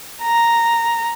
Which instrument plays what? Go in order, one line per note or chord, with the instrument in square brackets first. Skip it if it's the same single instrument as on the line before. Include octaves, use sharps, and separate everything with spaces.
[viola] A#5